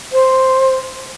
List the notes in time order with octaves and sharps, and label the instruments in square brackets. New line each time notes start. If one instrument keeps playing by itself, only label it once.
[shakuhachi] C5